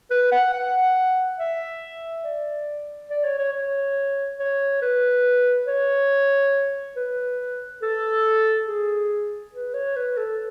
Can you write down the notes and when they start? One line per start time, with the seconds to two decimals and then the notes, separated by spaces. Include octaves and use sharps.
0.11 B4
0.32 F#5
0.54 F#5
1.39 E5
2.25 D5
3.10 D5
3.24 C#5
3.39 C#5
3.53 C#5
4.40 C#5
4.82 B4
5.67 C#5
6.96 B4
7.82 A4
8.67 G#4
9.53 B4
9.74 C#5
9.96 B4
10.17 A4